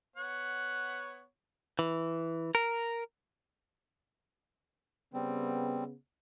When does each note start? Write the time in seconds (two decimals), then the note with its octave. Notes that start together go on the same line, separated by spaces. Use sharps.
0.16 B3 C#5 F#5
1.79 E3
2.55 A#4
5.14 C#3 G3 B3 C4